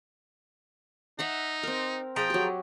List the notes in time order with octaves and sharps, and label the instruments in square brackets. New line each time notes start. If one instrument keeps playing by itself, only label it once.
[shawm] D#4 [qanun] E5 F#5 A#5
[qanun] C4 A#4
[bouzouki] F3 G#4 A#5 [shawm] G5
[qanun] F#3 G4